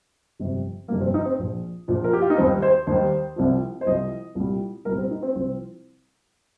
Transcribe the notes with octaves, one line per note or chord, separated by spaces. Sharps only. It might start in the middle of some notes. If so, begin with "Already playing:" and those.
G1 F2 C3 G3
G1 F2 C3 G3 A#3
C4
D#4
C4
A#1 A#2 F3
A#1 A#2 F3
A#4
G4
F4
D#4
D#2 D#3 G3 C4
C5
D#2 D#3 G3 C5
C2 C3 F3
C5
C2 C3 F3 D#5
C2 A#2 G3
C2 A#2 G3 A#4
C4
D#4
C4
C2 C3 F3 C4